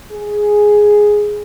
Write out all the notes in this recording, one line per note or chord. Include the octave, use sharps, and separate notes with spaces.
G#4